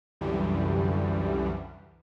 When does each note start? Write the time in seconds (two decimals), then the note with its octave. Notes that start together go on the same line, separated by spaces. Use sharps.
0.21 C2 F#2 D3 E3 G3